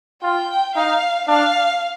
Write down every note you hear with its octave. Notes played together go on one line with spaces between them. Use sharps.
F4 G5
D#4 F5
D4 F5